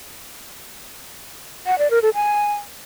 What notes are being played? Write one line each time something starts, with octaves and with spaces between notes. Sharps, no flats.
F#5
D5
A#4
A4
G#5